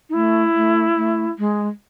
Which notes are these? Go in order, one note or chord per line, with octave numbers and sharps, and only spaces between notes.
D#4
A3 E4
A3
A3
G#3